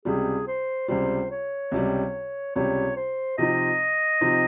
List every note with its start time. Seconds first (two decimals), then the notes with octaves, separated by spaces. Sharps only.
0.05 C#2 C3 G3 G#4
0.47 C5
0.88 C#2 C3 G3 C5
1.31 C#5
1.71 C#2 C3 G3
2.55 C#2 C3 G3 C#5
2.96 C5
3.38 C3 F3 C4 D#4 D#5
4.21 C3 F3 C4 D#4